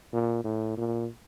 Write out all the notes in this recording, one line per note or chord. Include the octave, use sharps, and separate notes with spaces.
A#2
A2
A#2